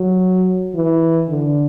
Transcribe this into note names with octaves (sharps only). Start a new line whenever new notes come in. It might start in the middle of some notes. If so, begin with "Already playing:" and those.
Already playing: F#3
E3
D3